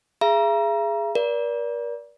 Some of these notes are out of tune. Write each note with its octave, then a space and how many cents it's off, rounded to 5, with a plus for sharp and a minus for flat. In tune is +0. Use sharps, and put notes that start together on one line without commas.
G#4 +0 E5 +45 A#5 +25
A#4 +40 D5 -20